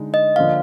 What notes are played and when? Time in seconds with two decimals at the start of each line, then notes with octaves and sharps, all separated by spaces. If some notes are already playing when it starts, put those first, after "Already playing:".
Already playing: D3 G#3 D#4
0.14 D#5
0.36 D3 F3 A#3 F5